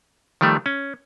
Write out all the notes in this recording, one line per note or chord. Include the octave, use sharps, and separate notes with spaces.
D#3 F3 G3 A3
C#4